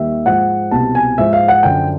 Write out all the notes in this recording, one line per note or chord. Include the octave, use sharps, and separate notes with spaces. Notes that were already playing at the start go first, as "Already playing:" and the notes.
Already playing: D#2 D#3 G3 E5
G#2 F3 F#5
C2 B2 G3 A5
G#5
G#2 F3 E5
F5
F#5
F#2 D3 F3 G5